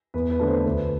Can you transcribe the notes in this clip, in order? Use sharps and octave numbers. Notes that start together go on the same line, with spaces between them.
E2 B4
B4
D3 A3 D4
C5
D2 B4